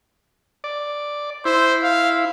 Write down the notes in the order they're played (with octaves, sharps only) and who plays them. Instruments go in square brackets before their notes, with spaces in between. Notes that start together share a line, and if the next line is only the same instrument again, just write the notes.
[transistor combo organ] D5
[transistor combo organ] E4 [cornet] C5
[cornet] F5